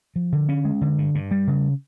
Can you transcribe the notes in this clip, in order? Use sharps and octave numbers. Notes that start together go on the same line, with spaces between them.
F3
D3
C#4
G#3
D3
G2
G2
G3
C#3